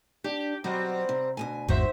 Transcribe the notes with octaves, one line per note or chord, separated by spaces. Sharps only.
D4 G4
B2 F#3 G3 C4 F#4
C3
D2 B2 G#5
G#1 E2 G#2 D#4 F#4 C5 E5